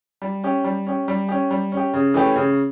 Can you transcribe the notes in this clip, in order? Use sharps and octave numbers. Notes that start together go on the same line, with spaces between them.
G3
C#4 G4
G3
C#4 G4
G3
C#4 G4
G3
C#4 G4
C#3
E3 A3 C#4 G4
C#3